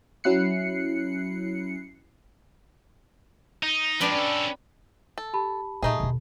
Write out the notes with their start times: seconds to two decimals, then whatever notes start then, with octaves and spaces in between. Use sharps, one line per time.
0.24 F#3 C#4 E4 F#6 C7 C#7
3.63 D#4
4.00 F3 G#3 D4 B4 G5
4.15 C#4 A4
5.18 A4
5.34 G4 A5 B5
5.83 A#2 A3 D#4 F4 G#4
6.00 E1 D3